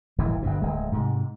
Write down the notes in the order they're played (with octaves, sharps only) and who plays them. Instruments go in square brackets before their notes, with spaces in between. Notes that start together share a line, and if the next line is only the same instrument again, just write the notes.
[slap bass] D#1 G#1 E3
G1 G2 B2
D1 G#3
G#2 C3